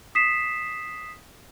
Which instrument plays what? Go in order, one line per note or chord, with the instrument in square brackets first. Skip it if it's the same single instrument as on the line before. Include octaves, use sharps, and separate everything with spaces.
[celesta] D#6 B6 C7 E7